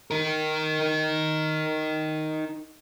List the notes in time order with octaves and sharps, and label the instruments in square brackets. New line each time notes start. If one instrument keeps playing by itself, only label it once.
[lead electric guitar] D#4 A#4